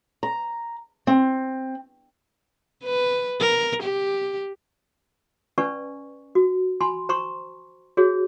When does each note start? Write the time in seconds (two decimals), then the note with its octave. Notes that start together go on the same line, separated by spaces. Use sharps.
0.23 A#5
1.07 C4
2.84 B4
3.40 A#4
3.83 G4
5.58 C#4 B4 D5 G#5 C#6
6.35 F#4
6.81 G#5 B5 C6
7.09 C5 A#5 C6 C#6
7.97 F#4 G#4 C#5